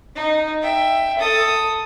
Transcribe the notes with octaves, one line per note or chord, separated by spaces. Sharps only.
D#4
E5 G5
A4 D#6